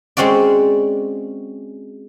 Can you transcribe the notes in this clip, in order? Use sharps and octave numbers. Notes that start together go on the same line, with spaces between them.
G#3 C4 C#4 F#4 D5